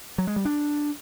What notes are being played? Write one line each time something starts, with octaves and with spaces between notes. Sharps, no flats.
F#3
G#3
G3
D4